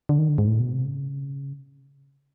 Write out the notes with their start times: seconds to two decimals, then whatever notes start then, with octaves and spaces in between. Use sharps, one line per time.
0.09 D3
0.19 D#3
0.29 D3
0.38 G#2
0.47 A2
0.59 B2
0.73 C3
0.85 C#3